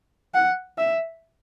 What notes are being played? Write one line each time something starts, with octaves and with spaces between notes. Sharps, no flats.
F#5
E5